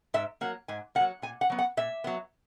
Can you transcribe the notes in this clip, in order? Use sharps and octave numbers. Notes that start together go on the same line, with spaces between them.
G#2 E5
F#3 A#3 F#5
G#2 G#5
A#3 F#5
F#3
A#2 G#5
F#5
F#3 B3
F#5
A#2 E5
F#3 B3